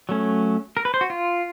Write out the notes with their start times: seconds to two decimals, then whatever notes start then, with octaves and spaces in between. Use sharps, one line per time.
0.09 F#3 A3 C#4
0.77 A#4
0.85 B4
0.94 C5
1.01 F#4
1.10 F4